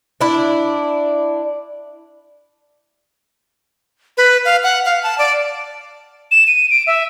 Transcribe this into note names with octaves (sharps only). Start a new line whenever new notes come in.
D4 E4
B4
F5
F#5
F5
A5
D5
E7
D#7
D7
E5